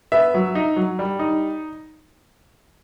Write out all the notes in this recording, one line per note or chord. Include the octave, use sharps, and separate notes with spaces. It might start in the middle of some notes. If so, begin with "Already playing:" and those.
B3 E5
F#3
D#4
F#3
G3
D#4